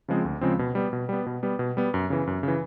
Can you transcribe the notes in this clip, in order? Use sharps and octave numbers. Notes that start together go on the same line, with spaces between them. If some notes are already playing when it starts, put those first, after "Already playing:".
C#3 F3 G#3 C4
D2
C#3 F3 G#3 C4
B2
G3 B3
B2
G3 B3
B2
G3 B3
B2
G3 B3
F#2
C#3 E3
F#2
C#3 E3